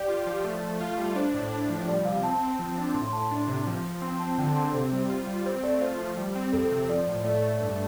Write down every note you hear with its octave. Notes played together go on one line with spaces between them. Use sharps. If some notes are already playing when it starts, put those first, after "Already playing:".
Already playing: G4 D5
F4
F3
A3
A3
F4 F5
G3
D4 C5
A2
D4
F3
G3 D5
C3 F5
C4 A5
C4
F3
D4
A2 C6
C6
A2 A5
D4 C6
C3
F3
F3
C4 C6
C4 A5
D3 G5
A5
C4 C6
A4
C3 C5
G3
F4
G3
C4 C5
A3 D5
F4 C5
F3
G3
C4
F2 A4
C3
F3 D5
A2
A3 D5
A3
G2